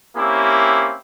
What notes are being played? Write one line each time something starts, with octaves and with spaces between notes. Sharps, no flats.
A#3 C4 C#4 E4 G4